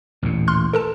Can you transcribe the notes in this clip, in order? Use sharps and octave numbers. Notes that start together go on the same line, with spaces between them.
A1 D#2 A#2
C6 F6 F#6
A4 A#4 A5